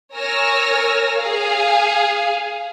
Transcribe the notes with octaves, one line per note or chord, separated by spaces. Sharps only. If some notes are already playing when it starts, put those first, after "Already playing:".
A#4 C#5 G#5 E6 F6 A#6
G#4 F5